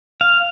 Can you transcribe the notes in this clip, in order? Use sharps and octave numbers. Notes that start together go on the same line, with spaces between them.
F5